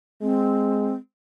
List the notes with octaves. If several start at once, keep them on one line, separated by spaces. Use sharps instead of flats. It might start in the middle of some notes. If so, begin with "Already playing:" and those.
G#3 C4